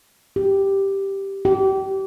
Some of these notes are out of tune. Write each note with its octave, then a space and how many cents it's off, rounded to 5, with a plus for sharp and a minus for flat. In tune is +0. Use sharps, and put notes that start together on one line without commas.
G4 +0
G4 -30